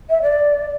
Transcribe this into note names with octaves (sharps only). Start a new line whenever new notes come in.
E5
D5